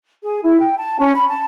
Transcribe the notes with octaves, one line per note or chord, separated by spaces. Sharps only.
G#4
E4
G5
A5
C#4
B5
A5